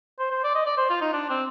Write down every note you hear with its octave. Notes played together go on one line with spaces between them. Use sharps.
C5
C5
D5
D#5
D5
C5
F4
D#4
D4
C4